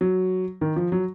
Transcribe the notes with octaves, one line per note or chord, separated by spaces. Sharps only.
F#3
D#3
F3
F#3